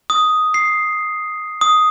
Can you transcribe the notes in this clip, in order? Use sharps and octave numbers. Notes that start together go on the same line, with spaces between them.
D#6
C7
D#6